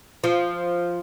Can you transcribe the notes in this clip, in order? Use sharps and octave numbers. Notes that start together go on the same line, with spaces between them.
F3